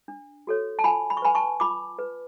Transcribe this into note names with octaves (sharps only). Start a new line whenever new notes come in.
D4
F#4 A4 C#5
A5
F4 G#5 B5
B5
C#6
B4 G#5 B5
A5 C#6
F4 B5 D6
B4